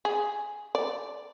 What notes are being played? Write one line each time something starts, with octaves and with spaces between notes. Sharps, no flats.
G#4
D5